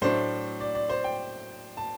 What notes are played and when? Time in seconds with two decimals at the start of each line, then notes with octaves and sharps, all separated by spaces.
0.02 A2 F#3 A3 D4 C5
0.60 D5
0.75 D5
0.90 C5
1.04 G5
1.77 A5